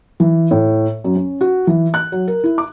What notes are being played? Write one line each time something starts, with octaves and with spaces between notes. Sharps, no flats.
E3
A2
F#2
C#4
F#4
E3
F#6
F#3
A#4
E4
D6